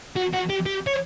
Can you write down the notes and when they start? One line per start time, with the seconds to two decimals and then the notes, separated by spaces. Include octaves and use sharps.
0.16 F#4
0.33 F#4
0.50 G4
0.66 G4
0.87 C#5